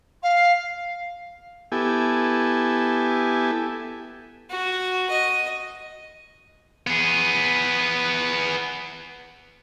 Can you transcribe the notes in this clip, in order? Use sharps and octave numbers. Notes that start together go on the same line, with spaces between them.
F5
B3 E4 G4 A4 G#5
F#4
D#5
B3 G#4